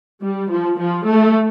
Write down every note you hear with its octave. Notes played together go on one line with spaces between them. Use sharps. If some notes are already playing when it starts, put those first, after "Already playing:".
G3
F3
F3
A3